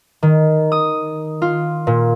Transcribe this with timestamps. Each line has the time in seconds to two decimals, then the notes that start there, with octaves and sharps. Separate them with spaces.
0.23 D#3
0.72 D#6
1.42 F4
1.87 A#2